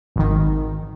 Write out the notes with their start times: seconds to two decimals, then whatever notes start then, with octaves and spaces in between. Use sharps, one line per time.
0.16 G#1 D#3